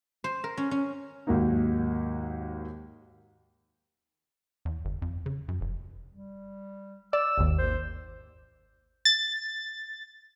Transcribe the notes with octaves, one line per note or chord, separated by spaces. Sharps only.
C5
A#4
C#4
C#4
D#2 G#2 F#3 A#3 D#4
E2
G1
F2
C#3
F#2
F1
G3
D5 E6
G#1 D#2
C5
A6